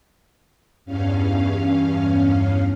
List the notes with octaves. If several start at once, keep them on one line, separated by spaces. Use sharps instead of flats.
E2 G2 C#4 F5